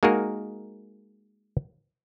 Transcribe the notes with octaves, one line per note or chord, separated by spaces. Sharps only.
G#3 A#3 D#4 F#4 G#4 A#4